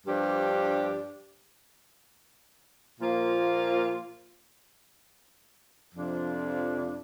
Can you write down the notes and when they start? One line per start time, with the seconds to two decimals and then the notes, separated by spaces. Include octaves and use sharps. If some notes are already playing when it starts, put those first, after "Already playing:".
0.07 G2 F3 D4 G4
3.00 A#2 F3 A#3 F4
5.94 F2 C3 F3 D4